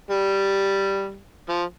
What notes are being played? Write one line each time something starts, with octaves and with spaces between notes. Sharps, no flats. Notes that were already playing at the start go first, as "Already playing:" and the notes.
G3
F3